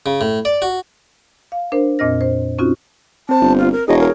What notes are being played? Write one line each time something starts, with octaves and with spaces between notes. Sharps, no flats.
C#3
A2
D5
F#4
F5
D4 A#4 C5
F2 A#2 C4 D#5 F6 A#6
C5
C4 C#4 D#4 F4 F#4
C4 C5 A5
G1
F4
A#4
E1 G#4 C#5 D#5
A#4